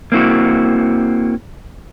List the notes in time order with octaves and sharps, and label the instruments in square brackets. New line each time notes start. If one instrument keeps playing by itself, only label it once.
[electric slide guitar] A#3 C4 E4 F#4